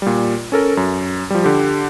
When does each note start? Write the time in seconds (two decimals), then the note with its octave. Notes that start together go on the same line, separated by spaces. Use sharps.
0.02 A#2 G3
0.52 C#4 A4 A#4
0.77 F#2
1.30 F3 G3
1.44 D3 G4